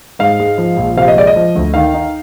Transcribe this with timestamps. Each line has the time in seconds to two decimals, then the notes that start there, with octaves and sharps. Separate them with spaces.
0.19 G#2 F5
0.40 G#3
0.58 F3
0.77 A#1
0.97 C3 F5
1.08 D#5
1.16 G#3 D5
1.27 D#5
1.36 F3
1.56 D2
1.74 D#3 F5
1.94 D#4